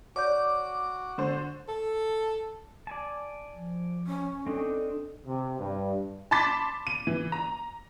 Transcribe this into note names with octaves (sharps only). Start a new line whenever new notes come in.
F#4 C#5 D5 D6 G6
D3 C5
A4
D5 G#5 A5
F3
C#4
C4 D4 D#4 A4
C3
G2
A5 B5 C6 D6 A6 B6
D#7
E3
A#5